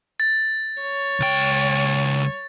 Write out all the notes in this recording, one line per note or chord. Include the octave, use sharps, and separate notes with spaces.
A6
C#5
C#2 G5